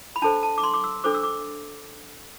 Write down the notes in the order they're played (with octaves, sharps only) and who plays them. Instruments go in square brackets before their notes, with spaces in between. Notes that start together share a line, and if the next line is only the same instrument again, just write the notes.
[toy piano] B5
D4 A4 C5 A5
A5
D6
C6
D6
E6
D4 A4 C5 D6
E6
D6